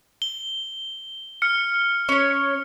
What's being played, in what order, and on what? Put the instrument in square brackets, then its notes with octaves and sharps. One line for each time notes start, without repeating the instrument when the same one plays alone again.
[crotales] G7
F6 C#7
[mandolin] C#4 C#5